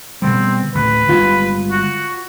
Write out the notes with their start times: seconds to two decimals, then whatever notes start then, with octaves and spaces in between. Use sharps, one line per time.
0.22 B2 D3 G3 C4
0.75 A1 D2 B4
1.09 G1 G#3 F4
1.71 F#4